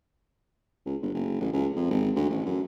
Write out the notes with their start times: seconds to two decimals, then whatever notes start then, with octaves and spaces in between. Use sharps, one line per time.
0.86 C#2
1.02 G1
1.14 F#1
1.40 A1
1.53 C#2
1.76 F2
1.90 G#1
2.15 D2
2.30 A1
2.46 F#2